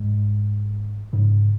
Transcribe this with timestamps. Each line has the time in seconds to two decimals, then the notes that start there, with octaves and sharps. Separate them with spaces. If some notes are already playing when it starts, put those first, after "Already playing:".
Already playing: G#2
1.13 G#2 C#3